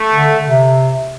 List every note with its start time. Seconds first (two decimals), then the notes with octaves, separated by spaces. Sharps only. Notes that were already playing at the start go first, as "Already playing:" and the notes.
Already playing: A3
0.14 D3
0.47 C3